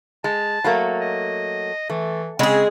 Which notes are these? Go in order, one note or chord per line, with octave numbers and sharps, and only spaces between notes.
G#3 A5
F#3 A3 A#3
D#5
E3 A3
C#3 G#3 C4 G#4